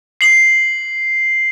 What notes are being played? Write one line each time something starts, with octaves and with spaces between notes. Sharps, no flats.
C7 F#7